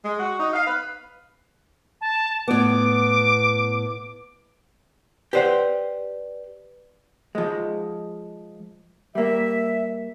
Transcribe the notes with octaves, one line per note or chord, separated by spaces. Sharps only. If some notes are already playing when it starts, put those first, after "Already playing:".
G#3
F#4
D#4
F5
B4
A5
A2 B3 D6
G4 B4 C5 D5 F#5
F3 G#3
G3 A#3 E5